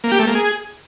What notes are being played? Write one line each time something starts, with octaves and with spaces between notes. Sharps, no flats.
A#3
G4
A3
A#3
G#4